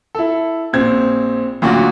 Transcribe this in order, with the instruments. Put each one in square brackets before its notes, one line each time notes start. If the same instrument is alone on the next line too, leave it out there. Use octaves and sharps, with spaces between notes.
[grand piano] E4 A4
A#1 C4 G#6
[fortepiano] D2 A#2 F#4 [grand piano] F#3 D4